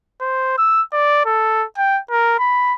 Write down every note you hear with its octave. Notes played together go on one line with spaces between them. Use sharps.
C5
E6
D5
A4
G5
A#4
B5